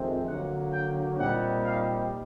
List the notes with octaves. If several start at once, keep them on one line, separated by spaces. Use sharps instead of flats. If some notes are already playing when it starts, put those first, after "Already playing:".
Already playing: F2 C3 D#3 G#3 C4
D3 F#3 A#3 F#5
G5
A#2 G3 C4 D#4 F#5
F5